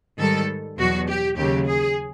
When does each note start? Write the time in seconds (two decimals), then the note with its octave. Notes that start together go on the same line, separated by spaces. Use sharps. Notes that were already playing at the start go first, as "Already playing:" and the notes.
0.18 G#2 D#3 G3 A4
0.78 E2 B2 F#3 F#4
1.07 G4
1.37 D#2 C#3 F#3 G4
1.66 G#4